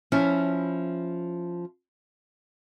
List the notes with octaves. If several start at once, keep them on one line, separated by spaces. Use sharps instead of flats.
F3 C#4 E4